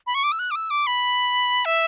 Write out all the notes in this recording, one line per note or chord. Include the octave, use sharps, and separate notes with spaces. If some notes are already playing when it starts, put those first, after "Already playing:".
B5
C#6
D6
E6
F#6
D6
E6
D6
B5
E5